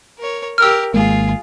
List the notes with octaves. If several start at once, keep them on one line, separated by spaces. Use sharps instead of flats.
A#4 C#5
G4 A#4 E6 F6
G#1 G#3 A#3 F4 G#4